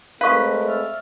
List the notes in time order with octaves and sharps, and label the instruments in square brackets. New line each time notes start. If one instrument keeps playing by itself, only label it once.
[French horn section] G#3 A3 C4 [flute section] A#4 [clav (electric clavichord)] B4 [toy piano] F5 C#6
[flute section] D5 E5 F6